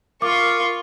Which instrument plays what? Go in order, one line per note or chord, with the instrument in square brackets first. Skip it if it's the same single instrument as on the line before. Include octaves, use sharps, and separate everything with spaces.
[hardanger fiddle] F4 C#6 [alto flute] A#4 [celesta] D6